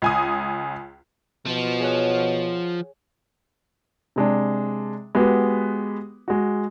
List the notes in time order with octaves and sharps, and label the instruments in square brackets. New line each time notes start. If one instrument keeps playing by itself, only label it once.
[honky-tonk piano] C#2 G#5 D#6
[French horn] B2 [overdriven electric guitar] F3
[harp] G#4 C#5 F#5
[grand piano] C3 G#3 D4
G#3 B3 F#4 G4 B4
G#3 F#4